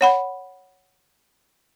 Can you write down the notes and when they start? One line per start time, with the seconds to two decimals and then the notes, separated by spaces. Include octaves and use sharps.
0.01 C#5 F#5 B5